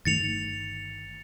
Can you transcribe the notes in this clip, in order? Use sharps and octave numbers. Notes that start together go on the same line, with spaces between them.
G1 D#3 A3 A6 C#7 F7